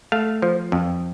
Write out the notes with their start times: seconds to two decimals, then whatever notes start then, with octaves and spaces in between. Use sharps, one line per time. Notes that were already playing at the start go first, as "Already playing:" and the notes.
0.12 A3 F5
0.42 F3
0.72 F2